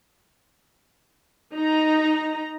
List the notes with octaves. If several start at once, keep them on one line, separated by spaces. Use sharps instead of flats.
D#4 A#5